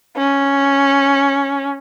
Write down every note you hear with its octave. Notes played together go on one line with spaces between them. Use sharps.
C#4